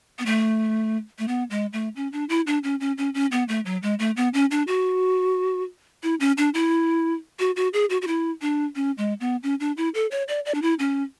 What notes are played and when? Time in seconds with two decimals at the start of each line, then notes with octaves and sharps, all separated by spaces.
0.19 B3
0.26 A3
1.19 A3
1.28 B3
1.50 G#3
1.73 A3
1.96 C#4
2.13 D4
2.29 E4
2.47 D4
2.63 C#4
2.80 C#4
2.98 C#4
3.14 C#4
3.32 B3
3.48 A3
3.66 F#3
3.83 G#3
3.99 A3
4.17 B3
4.34 C#4
4.51 D4
4.67 F#4
6.03 E4
6.20 C#4
6.38 D4
6.54 E4
7.39 F#4
7.56 F#4
7.73 G#4
7.90 F#4
8.02 F#4
8.07 E4
8.42 D4
8.76 C#4
8.98 G#3
9.21 B3
9.43 C#4
9.60 D4
9.77 E4
9.94 A4
10.11 C#5
10.28 D5
10.46 D5
10.55 D4
10.62 E4
10.79 C#4